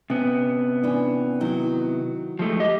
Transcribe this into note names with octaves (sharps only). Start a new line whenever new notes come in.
C3 B3 C#4
E3 C#4 D4
D#3 F#3 E4
F3 G#3 A3
G4 D#5